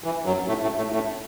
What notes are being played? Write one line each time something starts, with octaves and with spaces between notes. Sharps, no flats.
E3
F#2 F#3
A2 A3
A2 A3
A2 A3
A2 A3